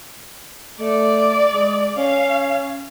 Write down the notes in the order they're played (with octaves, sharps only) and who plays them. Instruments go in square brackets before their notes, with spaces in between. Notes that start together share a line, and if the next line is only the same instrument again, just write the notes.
[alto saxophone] A3 [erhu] D5
[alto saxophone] G#3
[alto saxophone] C#4 [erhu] F5